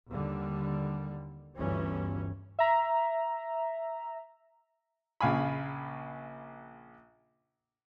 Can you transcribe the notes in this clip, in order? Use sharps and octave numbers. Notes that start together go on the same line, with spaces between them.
D#2 D3 G3
G1 D2 E3 G3 C#4
E5 A#5
A#1 C#3 F5 G#5 B5